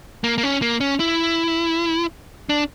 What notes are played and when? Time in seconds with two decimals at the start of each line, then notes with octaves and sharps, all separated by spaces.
0.24 A#3
0.38 A#3
0.43 C#4
0.62 A#3
0.81 C#4
1.00 E4
2.49 D4